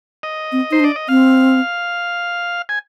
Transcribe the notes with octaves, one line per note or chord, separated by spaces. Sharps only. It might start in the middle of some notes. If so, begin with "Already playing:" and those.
D#5
C4
D#4 C5
D4
D5
D#5
C4 F5
G#5